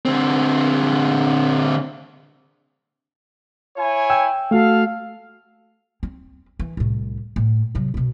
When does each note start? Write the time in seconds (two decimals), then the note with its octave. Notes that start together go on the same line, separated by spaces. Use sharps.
0.05 D3 C4
3.77 E4 C#5 G#5
4.10 G5 E6
4.51 A3 F#4 A4 F5
6.03 C4
6.59 E3
6.77 C2 A2
7.36 A2
7.75 C3 F#3
7.94 F#2 B2